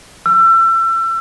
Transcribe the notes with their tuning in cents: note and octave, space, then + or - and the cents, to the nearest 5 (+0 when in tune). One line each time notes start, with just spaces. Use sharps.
E6 +30